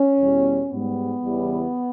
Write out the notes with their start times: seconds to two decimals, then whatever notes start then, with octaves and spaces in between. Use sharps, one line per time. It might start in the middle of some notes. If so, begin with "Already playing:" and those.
Already playing: C#4
0.19 E2 B2 G3
0.72 G#2 G3 B3
1.23 E2 C#3 E3 G3